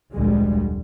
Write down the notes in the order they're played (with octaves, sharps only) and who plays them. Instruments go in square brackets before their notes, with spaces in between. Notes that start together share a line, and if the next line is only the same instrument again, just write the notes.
[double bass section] F1 D2 A#2 G3 G#3